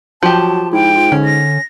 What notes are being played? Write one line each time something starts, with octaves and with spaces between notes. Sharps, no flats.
F3 F#3 G4 A5
G#2 E4 G5
F4
D3 C#4
A#6